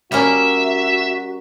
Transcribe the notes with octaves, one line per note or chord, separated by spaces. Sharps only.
G3 A#3 C#4 F#4 E5